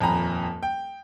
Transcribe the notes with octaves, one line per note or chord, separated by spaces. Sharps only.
D#1 F2 G#5 A#5 B5
G5